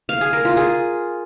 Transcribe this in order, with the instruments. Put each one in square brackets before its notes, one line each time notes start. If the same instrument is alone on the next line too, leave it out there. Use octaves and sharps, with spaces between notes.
[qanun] F5
G#4
A#4
F4
G#4